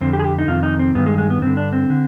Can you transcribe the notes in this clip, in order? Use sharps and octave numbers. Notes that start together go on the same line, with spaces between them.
F2 D3 C4
G4
G#4
G4
D#4
F2 C3 D#3 F4
D#4
C4
G2 D#3 B3
G#3
G#3
B3
G2 D3 C4
D4
C4
D3